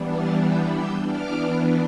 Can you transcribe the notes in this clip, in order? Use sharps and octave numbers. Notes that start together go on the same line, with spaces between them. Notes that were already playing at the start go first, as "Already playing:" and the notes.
Already playing: E3 G3 B3 D4
F6 A6
E6 G6
E6 G6
E3 B3 D4 D6 F6